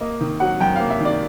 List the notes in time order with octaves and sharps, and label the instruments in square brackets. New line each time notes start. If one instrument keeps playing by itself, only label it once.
[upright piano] A#3 D#5
D#3
F#3 F#5
F#2 G5
F5
A#3
E5
D#3 D5